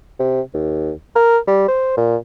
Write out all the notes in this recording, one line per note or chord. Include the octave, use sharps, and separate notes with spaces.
C3
D#2
A#4
G3
C5
A#2